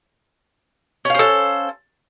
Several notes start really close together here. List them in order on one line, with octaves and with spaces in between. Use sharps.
C#4 F5 C5 A4